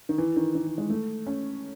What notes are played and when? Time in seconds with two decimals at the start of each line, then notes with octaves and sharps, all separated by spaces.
0.09 D#3
0.18 E3
0.37 D#3
0.55 D#3
0.67 E3
0.78 G#3
0.90 A3
1.27 C#4